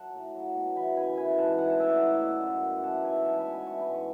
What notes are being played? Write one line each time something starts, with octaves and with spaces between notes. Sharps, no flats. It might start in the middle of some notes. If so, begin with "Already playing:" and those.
Already playing: F#3 F#5 A5
A2
F#3
B2
E3 G#5 B5
F#2 G#5 B5
E3 G#5 B5
G#2 F#5 A5
E3 F#5 A5
F#5 A5
A2 E5 G#5
D5 F#5
F#3
B2
F#2
F#3
E3 F#5 A5
G#2 E5 G#5
F#3 F#5 A5
G#5 B5
B2
G#5 B5
E3 A5 C#6
G#5 B5
G#2
A5 C#6